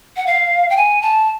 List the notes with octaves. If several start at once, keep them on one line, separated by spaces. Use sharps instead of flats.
F#5
F5
G5
G#5
A5